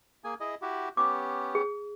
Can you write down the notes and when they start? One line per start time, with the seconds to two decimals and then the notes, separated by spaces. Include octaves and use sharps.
0.24 A#3 G#4 G#5
0.40 E4 G#4 D#5
0.62 E4 F#4 G4
0.97 B3 C#4 G4 D6
1.55 G#4